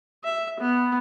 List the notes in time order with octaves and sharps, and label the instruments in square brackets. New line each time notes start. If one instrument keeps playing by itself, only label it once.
[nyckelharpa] E5
B3